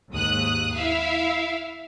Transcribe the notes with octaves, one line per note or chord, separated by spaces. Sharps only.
D#2 G#2 D#6 F#6
E4 E5 F5